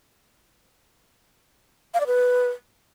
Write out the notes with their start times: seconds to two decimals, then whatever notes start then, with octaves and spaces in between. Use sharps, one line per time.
1.94 F5
2.00 D5
2.07 B4